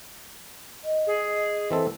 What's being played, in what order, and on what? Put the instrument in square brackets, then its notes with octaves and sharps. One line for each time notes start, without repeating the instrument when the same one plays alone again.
[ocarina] D#5
[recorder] G#4
[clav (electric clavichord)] E3 C4 A4